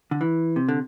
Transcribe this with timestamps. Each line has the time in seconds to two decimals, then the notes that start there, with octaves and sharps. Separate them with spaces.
0.11 D3
0.21 E3
0.56 C3
0.69 D3